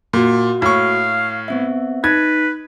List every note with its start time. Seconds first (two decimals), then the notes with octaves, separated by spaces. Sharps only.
0.13 A#2 A#3 F#4
0.62 A2 F5 C#6
1.48 B3 C4 E5
2.04 D#4 B4 G#6